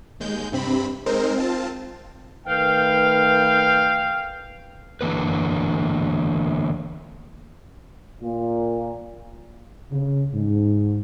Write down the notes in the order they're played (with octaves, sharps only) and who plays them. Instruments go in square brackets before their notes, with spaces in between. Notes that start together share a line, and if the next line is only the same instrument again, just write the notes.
[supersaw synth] D#2 G#3 G6
G2 C3 C4 B5
G#3 C4 D#4 A#4 C5
C4 F4 A5
[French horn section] D#3 A3 B4 [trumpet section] F5 G5
[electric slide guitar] D3 E3 A#3 B4
[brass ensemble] A#2
C#3
G#2